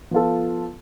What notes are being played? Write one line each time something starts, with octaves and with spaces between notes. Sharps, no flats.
F3 B3 F4 A4